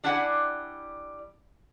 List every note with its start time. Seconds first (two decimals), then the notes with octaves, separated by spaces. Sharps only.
0.04 G3 D4 E4 G4 F#5 G#5